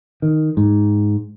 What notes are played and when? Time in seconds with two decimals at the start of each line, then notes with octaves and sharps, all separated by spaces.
0.22 D#3
0.57 G#2